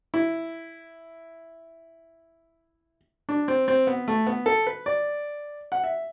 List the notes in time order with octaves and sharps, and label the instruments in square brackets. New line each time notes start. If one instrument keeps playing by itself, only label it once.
[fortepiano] E4
D4
C4
C4
B3
A3
B3
A4
B4
D5
F#5
E5